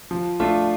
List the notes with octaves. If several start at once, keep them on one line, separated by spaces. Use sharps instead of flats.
F3
A3 D4 F4